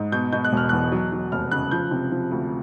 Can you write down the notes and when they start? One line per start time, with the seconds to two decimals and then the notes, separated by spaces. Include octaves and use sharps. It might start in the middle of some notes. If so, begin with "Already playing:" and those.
Already playing: G#2
0.12 B2 G6
0.32 B2 G6
0.44 F#6
0.53 E1 F6
0.69 E2 F#6
0.92 F#3
1.12 F#3
1.32 F1 F6
1.51 C#3 F#6
1.71 F3 G6
1.91 C3
2.12 F3
2.31 D2